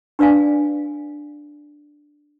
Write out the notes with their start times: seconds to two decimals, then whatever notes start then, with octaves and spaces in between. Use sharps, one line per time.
0.19 D4 B4 D5 F5 G#5